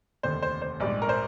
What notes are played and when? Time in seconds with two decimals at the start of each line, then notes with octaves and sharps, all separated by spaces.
0.23 F1 D#2 D3 C5
0.42 C5
0.62 C5
0.80 A#1 G#2 G3 D5
1.02 A#4
1.09 C5